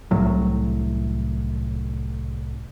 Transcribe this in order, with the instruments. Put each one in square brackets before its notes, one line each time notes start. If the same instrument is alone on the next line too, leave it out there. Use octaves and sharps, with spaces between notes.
[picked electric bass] C2 A2 F#3